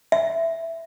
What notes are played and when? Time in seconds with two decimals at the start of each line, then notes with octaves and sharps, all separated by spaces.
0.12 E5